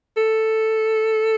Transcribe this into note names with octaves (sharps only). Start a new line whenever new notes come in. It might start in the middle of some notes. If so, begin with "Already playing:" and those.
A4